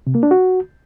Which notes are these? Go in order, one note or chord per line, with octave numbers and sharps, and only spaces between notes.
C3
A#3
D4
F#4